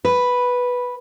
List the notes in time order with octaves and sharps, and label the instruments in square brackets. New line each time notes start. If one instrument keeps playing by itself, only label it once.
[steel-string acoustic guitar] B4